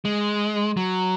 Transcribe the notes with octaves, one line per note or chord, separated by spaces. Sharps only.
G#3
F#3